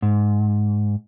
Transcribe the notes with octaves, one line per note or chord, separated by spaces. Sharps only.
G#2